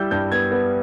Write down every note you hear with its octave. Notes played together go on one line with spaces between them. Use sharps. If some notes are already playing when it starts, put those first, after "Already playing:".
Already playing: G3 E4 E6 G6
G2 G6
B3 G#6
B3